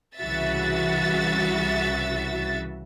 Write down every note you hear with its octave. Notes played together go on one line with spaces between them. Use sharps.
C2 C#3 E3 F#4 E5 A6